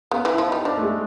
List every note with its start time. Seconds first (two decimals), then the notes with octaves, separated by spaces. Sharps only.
0.11 C#3 B3
0.25 E3 E4
0.38 F3
0.47 D#4
0.52 G3
0.65 F3 D4
0.77 A3
0.83 G#3